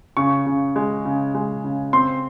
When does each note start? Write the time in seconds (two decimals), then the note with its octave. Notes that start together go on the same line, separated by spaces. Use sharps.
0.17 C#3 C#6
0.46 C#3
0.76 G#3
1.05 C#3
1.35 G#3
1.64 C#3
1.93 C4 C6